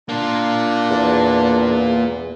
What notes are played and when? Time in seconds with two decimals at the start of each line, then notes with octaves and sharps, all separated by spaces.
0.09 A#3 D4 F4
0.90 E2